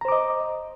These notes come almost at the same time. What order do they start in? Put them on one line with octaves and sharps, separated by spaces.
A#5 C5 D6 D#5